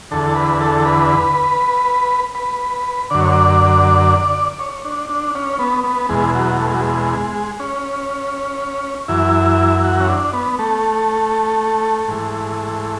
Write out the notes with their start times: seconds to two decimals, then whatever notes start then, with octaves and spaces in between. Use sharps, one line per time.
0.11 E2 D3 A4
0.35 B4
0.61 A4
0.86 B4
2.35 B4
3.10 F#2 D3 D5
3.20 C#5
3.32 D5
4.59 C#5
4.85 D4
5.09 D4
5.35 C#4
5.59 B3
5.84 B3
6.09 E2 B2 G#3
6.35 F#3
6.60 A3
6.66 G#3
6.74 F#3
6.80 G#3
7.60 C#4
9.08 F#2 E3 E4
9.84 F#4
10.00 C#4
10.09 D4
10.33 B3
10.59 A3
12.08 G#2 E3